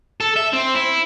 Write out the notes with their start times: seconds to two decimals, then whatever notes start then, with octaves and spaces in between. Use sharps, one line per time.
0.21 A4
0.36 E5
0.53 C4
0.75 E4